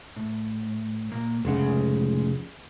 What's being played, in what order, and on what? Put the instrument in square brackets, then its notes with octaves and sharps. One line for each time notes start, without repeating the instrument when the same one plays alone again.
[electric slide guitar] A2
A#2 A#3
[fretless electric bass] F1 C#3 [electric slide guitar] A2 G#3 F#5